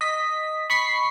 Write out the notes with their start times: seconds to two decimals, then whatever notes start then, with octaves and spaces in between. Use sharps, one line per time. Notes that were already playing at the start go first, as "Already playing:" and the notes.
0.01 D#5 B6
0.70 B5 C#6 B6 C7